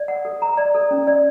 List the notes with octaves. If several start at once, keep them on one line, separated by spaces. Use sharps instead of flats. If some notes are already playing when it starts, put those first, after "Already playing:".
Already playing: D5
F#5
A4
A#5
D5
A4
C#4
D5